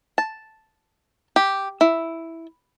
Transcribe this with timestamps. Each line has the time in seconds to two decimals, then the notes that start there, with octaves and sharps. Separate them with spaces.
0.18 A5
1.36 G4
1.81 E4